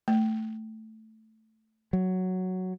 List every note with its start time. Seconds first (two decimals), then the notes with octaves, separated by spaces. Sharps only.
0.08 A3
1.93 F#3